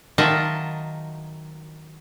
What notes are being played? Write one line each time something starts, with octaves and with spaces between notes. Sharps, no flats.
D#3 F#3 F4 D#5 E5 A5